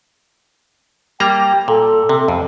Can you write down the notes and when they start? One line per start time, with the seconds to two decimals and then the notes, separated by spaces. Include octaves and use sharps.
1.20 G3 A#3 G5 A#5
1.68 A#2 A4
2.09 C3
2.28 F2